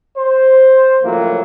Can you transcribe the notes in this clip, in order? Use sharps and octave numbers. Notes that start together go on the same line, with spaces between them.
C5
C#2 A2 F3 F#3 A#3